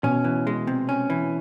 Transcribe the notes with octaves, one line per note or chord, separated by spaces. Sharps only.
B2 C#4
E3
G#3
C3
C#4
E3